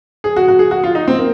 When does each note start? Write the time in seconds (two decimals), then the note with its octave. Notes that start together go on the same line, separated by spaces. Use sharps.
0.24 G#4
0.36 F#4
0.48 F#4
0.59 G#4
0.71 F#4
0.84 F4
0.95 D#4
1.07 C4
1.18 A#3